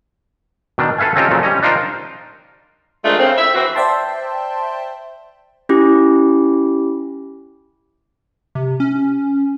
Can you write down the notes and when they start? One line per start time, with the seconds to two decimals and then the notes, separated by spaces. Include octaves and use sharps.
0.78 B2 D#3 D4
0.98 A4 B4 E5 F5 G#5
1.16 C4 C#4 D#4 F4 G4 A4
1.31 A#2 C#3 F3 F#3
1.43 G3 C#4 C#5 D#5
1.63 D4 D#4 F4 A#4 C5
3.04 D#3 F3 G#3 A3 D4 F4
3.19 C#3 C4
3.38 E5
3.55 E3 C4 F#4
3.75 C5 D5 E5 G5 A5 C6
5.69 C#4 E4 G4
8.55 C3
8.80 C#4